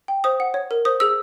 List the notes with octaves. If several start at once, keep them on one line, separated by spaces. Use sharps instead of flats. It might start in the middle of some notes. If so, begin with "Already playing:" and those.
G5
C5 D#6
F#5
C#5
A#4
C5 D#6
G#4 E6